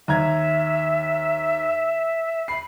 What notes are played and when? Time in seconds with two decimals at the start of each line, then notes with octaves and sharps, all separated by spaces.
0.08 D#2 E5 A#5 G#6
2.48 B5 C7